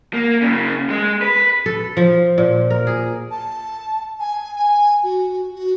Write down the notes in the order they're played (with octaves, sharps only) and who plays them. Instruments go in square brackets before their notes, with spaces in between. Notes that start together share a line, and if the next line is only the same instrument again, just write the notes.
[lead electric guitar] A#3
F#2 C#3
G#3
B4
[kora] A4
F3
A#2
A#4
G#4
[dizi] A5
G#5
G#5
F#4
F#4